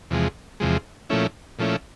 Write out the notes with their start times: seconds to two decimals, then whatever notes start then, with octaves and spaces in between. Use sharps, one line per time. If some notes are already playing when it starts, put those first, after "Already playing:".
0.11 E2 C3 F3 G#3
0.60 E2 C3 F3 G#3
1.10 A#2 F3 A3 C#4 E4
1.59 A#2 F3 A3 C#4 E4